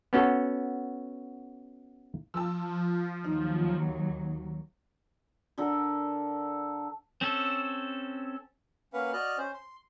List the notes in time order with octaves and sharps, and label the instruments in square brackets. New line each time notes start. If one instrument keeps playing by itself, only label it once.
[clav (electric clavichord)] B3 C#4 F#4 A4
[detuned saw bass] F3 [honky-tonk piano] A5 E6
[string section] D#2 F#3 [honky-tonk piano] D#4
[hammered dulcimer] D3 D4 A4 A#4
[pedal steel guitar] C4 C#4 A4
[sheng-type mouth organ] A#3 C#4 B4 F5 F#5
F#4 D5 D#5 F6 F#6
C#4 C5
C6